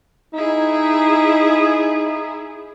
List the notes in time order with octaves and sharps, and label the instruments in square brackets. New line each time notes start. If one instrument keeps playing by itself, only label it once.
[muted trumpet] D#4 [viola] E4 G#4